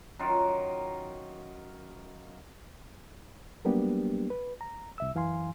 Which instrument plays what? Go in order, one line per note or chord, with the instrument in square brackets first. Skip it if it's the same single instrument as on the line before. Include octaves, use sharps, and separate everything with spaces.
[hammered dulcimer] F#2 D#3 F4
[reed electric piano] F#3 G3 A#3 B3 D4 G4
B4
A#5
C2 E5 E6
F#2 E3 F5 G#5 C6